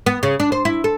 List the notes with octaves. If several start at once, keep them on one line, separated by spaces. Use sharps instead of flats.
B3
C#3
D4
C5
E4
A4